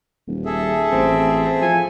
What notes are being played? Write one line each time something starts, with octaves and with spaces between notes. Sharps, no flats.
D#1
G#4 A4 E5
A1 C4
F3 G#5